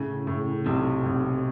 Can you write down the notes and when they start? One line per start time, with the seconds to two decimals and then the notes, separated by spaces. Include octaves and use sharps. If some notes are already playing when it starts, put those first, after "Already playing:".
Already playing: A2 C#3
0.27 A2
0.66 B1 C3
1.06 B1